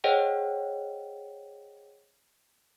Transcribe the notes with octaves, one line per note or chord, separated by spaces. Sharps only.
G#4 C5 C#5 D#5 F#5 G5